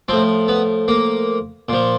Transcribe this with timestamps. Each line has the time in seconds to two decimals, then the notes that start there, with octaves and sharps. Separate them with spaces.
0.08 A2 F3 C4
0.48 B3
0.88 A#3
1.69 A#2 F3